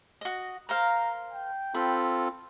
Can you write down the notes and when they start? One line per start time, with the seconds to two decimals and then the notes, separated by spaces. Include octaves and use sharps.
0.21 F#4 D#5
0.69 A#4 C5 F5 A#5
1.32 G5
1.74 C4 F4 A4 B5